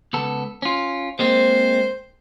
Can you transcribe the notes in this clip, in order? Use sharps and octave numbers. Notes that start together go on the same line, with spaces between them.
C#2 B3 A4
C#4 F4
G#3 A#3 C4 C5